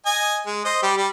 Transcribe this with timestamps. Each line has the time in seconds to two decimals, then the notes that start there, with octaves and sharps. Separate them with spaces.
0.05 D#5 G#5
0.46 G#3
0.65 C5 D#5
0.83 G3 G4
0.97 G3